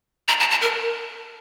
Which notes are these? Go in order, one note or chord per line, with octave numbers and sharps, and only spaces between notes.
A#5
A5
A5
A#4